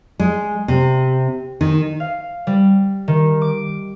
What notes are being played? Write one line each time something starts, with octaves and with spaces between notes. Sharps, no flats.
G#3
C3
D#3
F5
G3
D#3
D6